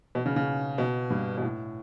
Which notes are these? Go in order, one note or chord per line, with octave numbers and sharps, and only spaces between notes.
B2
C#3
C#3
B2
G2
B2
A2